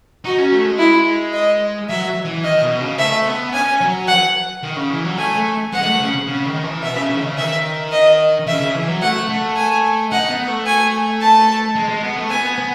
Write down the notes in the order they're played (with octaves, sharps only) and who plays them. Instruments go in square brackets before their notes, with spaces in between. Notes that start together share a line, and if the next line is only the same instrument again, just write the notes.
[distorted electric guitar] D#4 [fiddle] F#4
[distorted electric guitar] C#4
A3
G#3
[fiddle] E4
D#5
[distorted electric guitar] F#3 [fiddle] E5
[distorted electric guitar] E3
[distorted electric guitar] D#3 [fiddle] D#5
[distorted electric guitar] B2
C#3
[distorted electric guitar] A3 [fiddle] E5
[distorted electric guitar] B3
[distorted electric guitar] C#4 [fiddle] G#5
[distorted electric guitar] F#3
[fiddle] F#5
[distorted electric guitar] D#3
C#3
E3
F#3
[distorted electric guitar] A3 [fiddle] G#5
[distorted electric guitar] A3
[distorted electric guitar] G#3 [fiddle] F#5
[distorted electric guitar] G#3
A3
C#3
C#3
D#3
E3
[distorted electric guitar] B2 [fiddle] E5
[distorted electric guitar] C#3
C#3
D#3
C#3
[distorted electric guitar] D#3 [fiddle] E5
[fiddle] D#5
[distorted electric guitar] C#3 [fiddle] E5
[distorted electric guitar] C#3
E3
F#3
[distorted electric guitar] A3 [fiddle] F#5
[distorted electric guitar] A3
[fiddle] G#5
[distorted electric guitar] D#4 [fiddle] F#5
[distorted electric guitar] B3
A3
[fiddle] G#5
A5
[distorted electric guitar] G#3
G#3
B3
A3
[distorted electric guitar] B3 [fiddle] G#5
[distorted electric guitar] B3